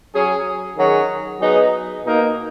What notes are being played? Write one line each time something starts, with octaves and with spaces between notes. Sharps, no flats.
F#3 C#4 G#4
D#3 F#3 C#4 G#4
F#3 B3 D#4 G#4
B2 A#3 D#4